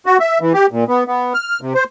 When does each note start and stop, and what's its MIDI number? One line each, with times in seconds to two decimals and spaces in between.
0.06 0.18 66
0.20 0.39 76
0.41 0.53 52
0.54 0.66 67
0.72 0.84 46
0.88 1.04 59
1.07 1.33 59
1.34 1.59 89
1.61 1.73 48
1.75 1.84 72